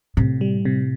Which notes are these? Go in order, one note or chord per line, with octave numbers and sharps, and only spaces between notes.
A2 C3
G3
C3